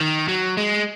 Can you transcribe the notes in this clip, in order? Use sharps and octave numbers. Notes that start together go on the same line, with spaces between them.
D#3
F#3
G#3